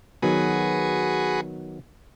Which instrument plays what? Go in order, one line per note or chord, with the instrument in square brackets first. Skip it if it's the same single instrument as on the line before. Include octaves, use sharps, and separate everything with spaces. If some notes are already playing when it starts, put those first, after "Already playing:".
[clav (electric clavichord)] D#3 F#3 B3 [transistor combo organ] F#4 G#4 B4